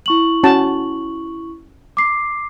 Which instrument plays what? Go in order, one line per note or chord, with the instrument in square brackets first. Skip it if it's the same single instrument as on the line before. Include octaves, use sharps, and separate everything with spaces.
[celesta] E4 C#6 F#7
[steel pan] C#4 F#4 A5
[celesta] D6 C7